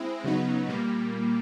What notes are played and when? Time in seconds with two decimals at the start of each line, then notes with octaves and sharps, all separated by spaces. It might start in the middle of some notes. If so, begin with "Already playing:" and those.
Already playing: G#3 C4 E4
0.24 C#3 F#3 B3 D#4
0.68 A#2 G3 A#3